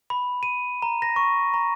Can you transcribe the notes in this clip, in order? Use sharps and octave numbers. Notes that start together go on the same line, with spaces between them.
B5
D#7
A#5
A#6
C#6
A#5